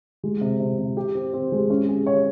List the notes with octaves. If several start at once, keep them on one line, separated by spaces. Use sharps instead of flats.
G#3
C3
C3
C3
G4
C4
C4
G#3
C#4
G#4
C#5